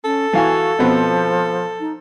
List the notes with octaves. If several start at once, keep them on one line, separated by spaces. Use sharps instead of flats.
C#4 A4
E3 F#4 F5 G#5
B2 F3 B3 C4
D#4